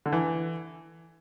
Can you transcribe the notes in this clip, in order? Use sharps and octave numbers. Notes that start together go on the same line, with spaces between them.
D3
E3